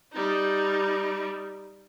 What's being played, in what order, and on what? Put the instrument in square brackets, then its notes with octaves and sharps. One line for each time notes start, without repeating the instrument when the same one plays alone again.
[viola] G3 D#4